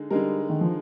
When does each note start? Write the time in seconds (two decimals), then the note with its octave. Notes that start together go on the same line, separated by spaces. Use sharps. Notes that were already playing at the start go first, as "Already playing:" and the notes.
Already playing: D3 G#3 D#4
0.10 D3 G3 G#3 D#4 A#4
0.49 D#3
0.61 F3